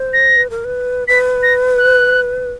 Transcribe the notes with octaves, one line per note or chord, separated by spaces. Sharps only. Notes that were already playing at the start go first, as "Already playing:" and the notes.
Already playing: C5
A#6
B4
A#4
B4
B4 B6
A#6
F#6